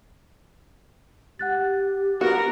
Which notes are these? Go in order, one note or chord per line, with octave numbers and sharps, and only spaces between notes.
G4 F#5 F#6 A6
B3 F#4 A#4